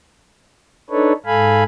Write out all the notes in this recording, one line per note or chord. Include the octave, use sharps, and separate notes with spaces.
D4 D#4 A4 B4 C#5
G#2 A4 F5 G#5 B5